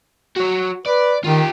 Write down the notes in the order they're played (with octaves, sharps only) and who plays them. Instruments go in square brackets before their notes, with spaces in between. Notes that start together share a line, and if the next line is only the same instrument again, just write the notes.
[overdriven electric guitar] F#4 C#5
[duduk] B4 [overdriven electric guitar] D5
[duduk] D#3 [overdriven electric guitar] F4 G4